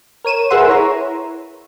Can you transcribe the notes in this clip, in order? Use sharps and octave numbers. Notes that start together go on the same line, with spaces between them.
A#4 C#5 D#7 E7
G#4 A#4 B4 E5 F#5 C6
E4 C#5 A#5